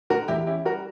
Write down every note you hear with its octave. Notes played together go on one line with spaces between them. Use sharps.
D3 F#4 A#4
E2 E4 G4
C#4 E4 G4
G3 F#4 A#4